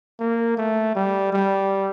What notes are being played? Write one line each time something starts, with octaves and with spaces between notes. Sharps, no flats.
A#3
A3
G3
G3